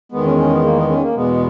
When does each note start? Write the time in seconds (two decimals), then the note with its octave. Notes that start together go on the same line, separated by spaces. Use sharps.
0.12 E2 D#3 G#3 B3
0.25 C#4
0.38 C#4
0.51 B3
0.64 A#3
0.76 B3
0.89 C#4
1.01 A#3
1.15 E2 B2 G#3 B3